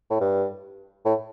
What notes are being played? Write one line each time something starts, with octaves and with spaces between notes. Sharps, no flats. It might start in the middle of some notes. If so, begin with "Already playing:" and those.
A2
G2
A2